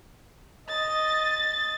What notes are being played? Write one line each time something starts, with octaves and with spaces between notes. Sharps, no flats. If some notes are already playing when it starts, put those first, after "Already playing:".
D#5 A6